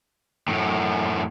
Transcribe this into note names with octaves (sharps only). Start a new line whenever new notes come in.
F#2 A2